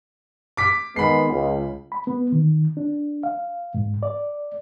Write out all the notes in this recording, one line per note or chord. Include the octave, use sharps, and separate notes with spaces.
D6 B6
D#3 G#3 B3 B5 C7
C#2
B5
B3
D#3
D4
F5
G#2
D5